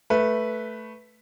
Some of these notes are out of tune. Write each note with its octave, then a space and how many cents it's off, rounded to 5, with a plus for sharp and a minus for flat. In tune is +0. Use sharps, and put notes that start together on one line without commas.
A3 +0 B4 -5